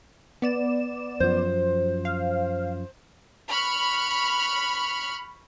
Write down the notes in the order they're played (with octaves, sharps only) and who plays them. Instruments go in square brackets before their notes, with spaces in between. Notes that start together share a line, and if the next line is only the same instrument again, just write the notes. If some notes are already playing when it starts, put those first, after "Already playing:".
[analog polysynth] B3 D5 E7
[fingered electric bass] F#2 F3 [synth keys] C5
[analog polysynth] F5
[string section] B5 C#6 F6 F#6